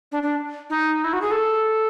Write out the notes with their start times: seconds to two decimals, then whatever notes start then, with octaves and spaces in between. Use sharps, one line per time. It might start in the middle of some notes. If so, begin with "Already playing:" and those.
0.12 D4
0.23 D4
0.70 D#4
1.04 E4
1.13 F#4
1.21 G#4
1.31 A4